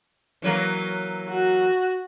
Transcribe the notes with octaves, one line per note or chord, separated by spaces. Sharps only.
E3 F#3 A#3
F#4